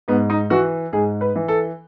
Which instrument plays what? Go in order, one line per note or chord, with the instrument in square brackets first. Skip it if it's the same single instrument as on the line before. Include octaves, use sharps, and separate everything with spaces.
[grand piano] G#2 B3
D#4
E3 F#4
G#2 G#4
B4
E3
A4